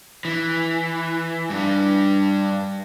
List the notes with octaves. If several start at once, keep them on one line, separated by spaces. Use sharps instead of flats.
E3
G2 G3